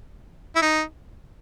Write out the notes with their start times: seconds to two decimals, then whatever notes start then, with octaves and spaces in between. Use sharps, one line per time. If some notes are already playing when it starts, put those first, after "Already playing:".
0.56 E4
0.62 D#4